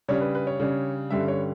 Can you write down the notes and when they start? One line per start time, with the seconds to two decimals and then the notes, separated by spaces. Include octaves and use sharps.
0.08 C#3 G3 D4 C#5
0.21 B4
0.35 B4
0.47 C#5
0.60 C#3 G3 D4
1.11 G2 D3 G3 C#4 E5
1.28 C#5